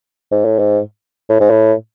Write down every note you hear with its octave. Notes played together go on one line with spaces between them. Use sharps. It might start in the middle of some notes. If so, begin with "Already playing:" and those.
G#2
A2
G#2
A2
G#2
A2